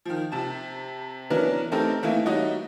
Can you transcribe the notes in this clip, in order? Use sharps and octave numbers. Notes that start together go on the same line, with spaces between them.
D#3 F3
C3 A5
E3 F#3 B3 C#4 D4 A#4
A3 C4 D#4 G4 A4 A#4
E3 A3 A#3 D#4 E4
G3 D#4 F#4 C#5 D#5